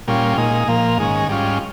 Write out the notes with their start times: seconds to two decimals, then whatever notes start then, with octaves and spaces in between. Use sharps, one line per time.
0.08 A#2 G3 C#4 F4
0.37 A#2 G#3 D#4
0.68 A#2 F3 A#3
0.98 G#2 D#3 G#3 C#4
1.29 G#2 G3 C#4 F4